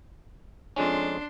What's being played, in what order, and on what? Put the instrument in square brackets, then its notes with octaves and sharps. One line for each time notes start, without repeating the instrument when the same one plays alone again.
[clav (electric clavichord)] F2 G#3 C#4 [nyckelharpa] D4 C6